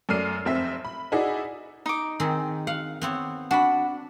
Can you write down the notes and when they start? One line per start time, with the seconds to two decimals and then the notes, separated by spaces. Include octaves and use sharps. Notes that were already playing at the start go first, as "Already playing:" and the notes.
0.09 F#2 A3 D5 F6 C7 D#7
0.45 F1 C4 E5
0.85 B5
1.12 D#4 E4 F#4 G#4 D5
1.86 D#4 D6
2.20 D#3 C4 G#4
2.67 F5 F#5
3.02 B3 C4 C#5
3.51 D4 F#4 B5